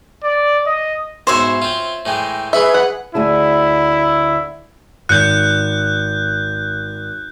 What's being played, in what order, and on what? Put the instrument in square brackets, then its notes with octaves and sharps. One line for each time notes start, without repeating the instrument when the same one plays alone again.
[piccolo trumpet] D5
D#5
[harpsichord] B1 G#2 [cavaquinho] C5 C#5 E5
[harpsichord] C4 F4
[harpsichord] A2 E3 G#3 [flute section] G5
[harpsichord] E3 B5 C#6 [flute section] G#4 B4 [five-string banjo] E5
[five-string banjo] F#5
[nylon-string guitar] D2 G#4 A5 [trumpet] E4
[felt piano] G#1 C#7 [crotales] F#6 G6